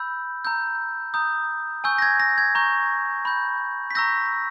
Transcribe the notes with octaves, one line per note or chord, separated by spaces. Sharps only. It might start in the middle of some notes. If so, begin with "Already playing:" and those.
Already playing: B5 E6 G6
A#5 E6 G6
A#5 D#6 G6
G#5 C#6 E6 G6
A#6
G#6
A#6
G#6
A#5 C#6 G6
B5 G6
B6
A#5 C#6 E6 G6 A#6